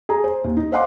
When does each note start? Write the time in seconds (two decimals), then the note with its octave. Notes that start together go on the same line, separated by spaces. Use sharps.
0.09 G#4 A#5
0.24 C5
0.44 D#2
0.57 D#4
0.72 C5 D#5 F5 F#5 C6 D6